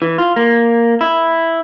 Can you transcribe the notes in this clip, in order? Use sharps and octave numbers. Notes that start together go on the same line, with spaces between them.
E3
F4
A#3
E4